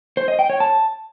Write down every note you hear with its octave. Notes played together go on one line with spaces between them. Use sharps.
C5
D#5
G5
C#5
A5